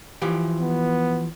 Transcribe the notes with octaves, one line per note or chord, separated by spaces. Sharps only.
E3 F3 G4
B3